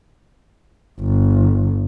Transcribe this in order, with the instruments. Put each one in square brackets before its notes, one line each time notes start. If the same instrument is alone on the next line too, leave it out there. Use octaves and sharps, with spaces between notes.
[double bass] G1